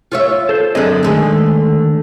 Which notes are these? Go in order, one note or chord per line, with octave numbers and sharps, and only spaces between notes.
F4 C#5 E5
A4 C5
F#2 D3 C4 G#4 D#5
D3 D#3 G#3 A3